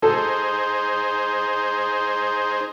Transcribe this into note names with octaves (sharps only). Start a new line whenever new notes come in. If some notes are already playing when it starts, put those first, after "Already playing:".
D#4 G#4 A4 C5